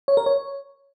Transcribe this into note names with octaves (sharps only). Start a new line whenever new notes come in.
C#5
A#4
C#5